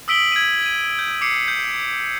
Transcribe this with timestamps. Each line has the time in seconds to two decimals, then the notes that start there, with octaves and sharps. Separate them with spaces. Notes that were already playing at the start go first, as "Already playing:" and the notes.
0.08 D#6 E6 B6 D7 F#7 G7
0.32 G#6 D#7
0.66 D#7
0.99 G6
1.21 D6 C7 C#7
1.48 G6